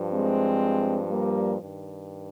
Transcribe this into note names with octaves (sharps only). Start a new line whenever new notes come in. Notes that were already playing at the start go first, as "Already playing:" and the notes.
Already playing: G2 F3
G#3 C4
G3 A#3
G2 D#3